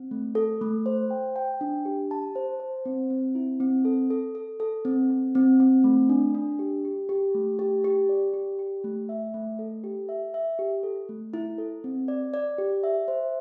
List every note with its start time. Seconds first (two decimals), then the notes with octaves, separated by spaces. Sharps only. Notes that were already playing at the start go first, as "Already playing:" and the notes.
Already playing: C4
0.11 A3
0.35 A4
0.61 A3
0.86 C5
1.10 G5
1.36 G5
1.61 D4
1.85 G4
2.11 A5
2.35 C5
2.60 C5
2.85 C4
3.10 C4
3.35 E4
3.60 C4
3.85 A4
4.10 A4
4.35 A4
4.60 A4
4.85 C4
5.10 C4
5.35 C4
5.60 C4
5.84 A3
6.09 D4
6.35 D4
6.59 G4
6.85 G4
7.09 G4
7.34 A3
7.59 G4
7.84 G4
8.09 D5
8.34 G4
8.59 G4
8.84 A3
9.09 E5
9.34 A3
9.59 A4
9.84 G4
10.09 E5
10.34 E5
10.59 G4
10.83 A4
11.09 A3
11.34 E4
11.58 A4
11.84 C4
12.08 D5
12.34 D5
12.58 G4
12.83 E5
13.08 C5